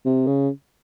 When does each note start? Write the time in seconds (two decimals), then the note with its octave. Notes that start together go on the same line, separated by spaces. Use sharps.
0.05 C3
0.27 C#3